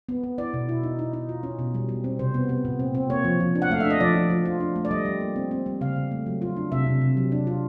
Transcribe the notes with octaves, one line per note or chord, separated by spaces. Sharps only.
B3
B3
E4 D5
B2
E4
D#4
D#4
D#4
F4
C#4
B2
G3
G3
C4
C3 C5
B3
B3
A#2
C4
C4
A#3 C#5
F3
F3
D4
F#5
A3 F5
E5
D4
D#5
F3 D5
F3
F3
F4
D4
A3
D5
G3 D#5
G3
A#3
C4
C4
G3
C#3 F5
C#3
A3
F#3
F4
D4
C3 E5
C3
C3
F#3
D4
F4